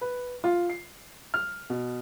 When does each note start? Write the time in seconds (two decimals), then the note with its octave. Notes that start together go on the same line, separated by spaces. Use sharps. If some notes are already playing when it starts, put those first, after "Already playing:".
0.01 B4
0.44 F4
0.70 C7
1.34 F6
1.70 B2